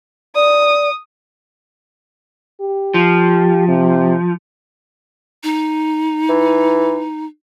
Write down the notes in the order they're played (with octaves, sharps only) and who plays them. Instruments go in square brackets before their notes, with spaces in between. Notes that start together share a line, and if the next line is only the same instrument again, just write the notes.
[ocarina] D5 [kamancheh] D#6
[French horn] G4
[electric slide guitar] F3
[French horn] C3
[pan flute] D#4
[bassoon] E3